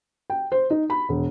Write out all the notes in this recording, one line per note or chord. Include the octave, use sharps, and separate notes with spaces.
G5
C5
D#4
B5
E1